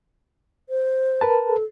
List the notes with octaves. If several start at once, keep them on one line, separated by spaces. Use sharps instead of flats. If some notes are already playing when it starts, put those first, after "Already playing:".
C5
A#4 B4 A5
A4